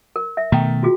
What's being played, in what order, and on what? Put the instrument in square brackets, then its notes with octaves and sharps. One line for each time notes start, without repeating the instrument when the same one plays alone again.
[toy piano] A#4
E5
[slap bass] B2 D#3 A3 [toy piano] G5 A#5
[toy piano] F4 F#4 G#4